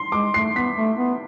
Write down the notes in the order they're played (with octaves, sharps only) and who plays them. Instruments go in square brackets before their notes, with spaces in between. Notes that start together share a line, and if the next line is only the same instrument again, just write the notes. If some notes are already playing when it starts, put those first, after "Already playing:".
Already playing: [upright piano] C6
[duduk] G#3 [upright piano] D6
[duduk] A3 [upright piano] C7
[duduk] B3 [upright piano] B6
[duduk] A3
B3